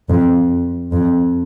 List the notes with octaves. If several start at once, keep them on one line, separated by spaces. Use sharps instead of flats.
F2
F2